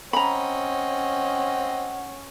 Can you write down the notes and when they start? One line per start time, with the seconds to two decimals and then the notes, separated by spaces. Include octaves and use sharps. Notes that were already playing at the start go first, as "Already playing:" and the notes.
0.13 C4 C#4 D#5 F#5 A#5 B5